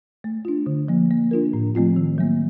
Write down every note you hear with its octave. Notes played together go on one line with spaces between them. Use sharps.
A3
D4 F4
D3
F3 A#3
A#3
D4 F4 A#4
A2
F3 A3 C4 F4
D#3
F#3 A#3